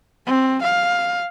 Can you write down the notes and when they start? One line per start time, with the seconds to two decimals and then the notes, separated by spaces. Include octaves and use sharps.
0.26 C4
0.62 F5